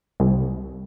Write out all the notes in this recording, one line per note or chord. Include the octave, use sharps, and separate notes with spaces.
C2